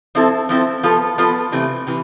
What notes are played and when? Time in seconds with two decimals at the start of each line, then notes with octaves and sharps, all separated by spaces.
0.15 F3 C4 E4 A4
0.49 F3 C4 E4 A4
0.83 F3 B3 F4 A4
1.18 F3 B3 F4 A4
1.52 C3 E3 A3
1.87 C3 E3